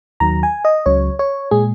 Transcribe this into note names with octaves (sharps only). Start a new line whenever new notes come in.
D#2 D#3 F#3 A#5
G#5
D#5
C#2 C#3 F#3 C#5
C#5
A#2 G#3 G#4